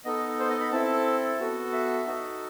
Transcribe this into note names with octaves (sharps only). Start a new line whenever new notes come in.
B3 D#4 A4 D#5
C5
D#5
B5
C4 E4 A4 A5
B3 F#4 A4
E5
D#4 F#4 A4